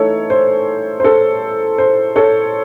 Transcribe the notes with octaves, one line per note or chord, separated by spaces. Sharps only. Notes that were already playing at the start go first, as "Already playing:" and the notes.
Already playing: E3 A3 D#4 A4 C#5
C5
C5
A4
C5
A4 C#5